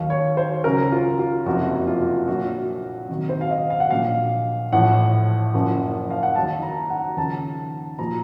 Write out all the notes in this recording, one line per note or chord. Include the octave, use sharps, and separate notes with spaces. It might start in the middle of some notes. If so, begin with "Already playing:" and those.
Already playing: D#2 D#3 F#3 F5
C#5
C5
C#2 C#3 F#3 A#4
F4
F4
F#1 F2 C3 F3 F#4
F4
F4
A#1 A#2 F#3 F#4
C2 C3 D#3 F#3
C5
F5
D#5
F5
F#5
A#1 A#2 F#3 F5
A1 A2 F3 F#5
F#1 F#2 F3
F5
F#5
D#2 D#3 F#3 A5
A#5
F#5
D#2 C#3 F3 A5
A#2 F3 A#5